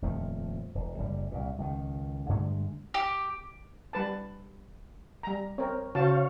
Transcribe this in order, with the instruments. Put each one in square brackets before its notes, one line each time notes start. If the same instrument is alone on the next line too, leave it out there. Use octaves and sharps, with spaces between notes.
[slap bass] D#1 F2 F3 A3
E1
F#1 G3
C2 A#2
C#2 D#3
G2 D3 G#3 A3
[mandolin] G4
[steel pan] G3 B4 A5
G3 A#5
[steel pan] C4 A#4 [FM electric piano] C#5
[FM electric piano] C#3 F#4 [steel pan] C5 A5 [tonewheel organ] C#5 F5